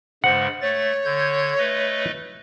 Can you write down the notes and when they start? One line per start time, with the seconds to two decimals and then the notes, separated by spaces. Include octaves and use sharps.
0.24 G2 C#3 G#3 C5 F#5
0.61 A3 C#5 A6
1.05 D3 G6 G#6
1.59 A3 B4 D#5